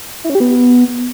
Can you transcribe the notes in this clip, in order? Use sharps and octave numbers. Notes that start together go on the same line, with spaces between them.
E4
C#4
G4
B3